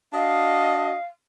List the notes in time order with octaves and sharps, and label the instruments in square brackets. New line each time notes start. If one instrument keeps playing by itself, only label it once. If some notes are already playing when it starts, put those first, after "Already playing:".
[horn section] D4 F#4 D#5 [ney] F5